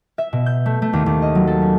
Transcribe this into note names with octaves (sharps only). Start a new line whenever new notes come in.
E5
B2
G6
A3
A3
D#2
D#2
D#5
F#3
A4
C#4